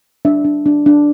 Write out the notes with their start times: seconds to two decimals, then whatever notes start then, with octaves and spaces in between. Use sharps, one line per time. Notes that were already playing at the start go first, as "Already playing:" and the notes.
0.25 D4 E5
0.44 D4
0.66 D4
0.86 D4